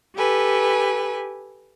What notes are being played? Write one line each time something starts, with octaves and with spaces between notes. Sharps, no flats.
G4 A4 B4 G#5